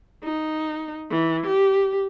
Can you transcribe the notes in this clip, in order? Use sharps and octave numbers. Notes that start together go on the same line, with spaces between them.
D#4
E3
G4